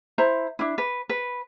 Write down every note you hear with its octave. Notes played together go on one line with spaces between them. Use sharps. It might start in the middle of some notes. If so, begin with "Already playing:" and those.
E4 C5 A#5
D4 E4
B4
B4